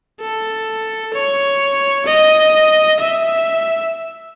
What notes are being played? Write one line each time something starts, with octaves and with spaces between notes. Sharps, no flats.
A4
C#5
D#5
E5